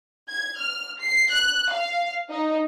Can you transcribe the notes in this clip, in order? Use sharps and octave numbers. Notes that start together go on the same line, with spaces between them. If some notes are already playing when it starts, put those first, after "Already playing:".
G#6
F6
C7
F#6
F5
D#4